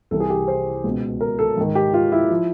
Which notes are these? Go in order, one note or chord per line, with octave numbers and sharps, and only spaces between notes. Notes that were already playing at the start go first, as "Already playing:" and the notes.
C2 C3 E3 A4
G#4
G4
C5
C#2 B2
A#4
A4
G#2 D#3
G4
F4
E4
F3